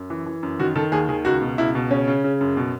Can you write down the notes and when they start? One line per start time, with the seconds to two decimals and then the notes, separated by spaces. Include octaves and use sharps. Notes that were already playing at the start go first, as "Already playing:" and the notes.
Already playing: F#2
0.10 E3
0.26 E3
0.43 F#2
0.60 D#3 F#4
0.76 D#3 A4
0.92 D#2 G#4
1.09 D#3 G#4
1.25 C#2 F#4
1.42 B2
1.58 C#2 E4
1.75 B2
1.91 C#3 C#4
2.08 C#3
2.24 C#3
2.41 F#2
2.57 B2